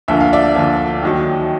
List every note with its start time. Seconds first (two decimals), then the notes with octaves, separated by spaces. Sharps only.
0.08 D2 D3 F3 A#3 E5
0.20 F5
0.33 D5 E5
0.55 D2 D3 F3 A#3
1.02 D#2 D#3 F#3